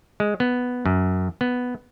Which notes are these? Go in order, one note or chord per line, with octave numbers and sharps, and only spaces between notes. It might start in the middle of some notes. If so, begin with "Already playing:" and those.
G#3
B3
F#2
B3